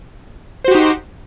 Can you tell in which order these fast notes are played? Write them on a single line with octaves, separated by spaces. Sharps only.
C5 F#4 G4 D#4